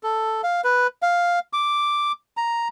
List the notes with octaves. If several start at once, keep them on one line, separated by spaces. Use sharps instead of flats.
A4
F5
B4
F5
D6
A#5